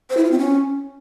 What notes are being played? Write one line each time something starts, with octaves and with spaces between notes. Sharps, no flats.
C5
E4
F4
C4
C#4